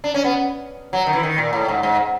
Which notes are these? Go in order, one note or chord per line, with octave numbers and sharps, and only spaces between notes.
D4
C#4
B3
F#3
D#3
E3
D#3
A#2
A2
G#2
G#2